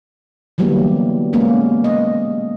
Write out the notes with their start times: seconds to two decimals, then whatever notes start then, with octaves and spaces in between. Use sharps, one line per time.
0.58 D3 E3 F#3 G3 A#3 B3
1.33 G#3 A#3 B3 C#4
1.84 D#5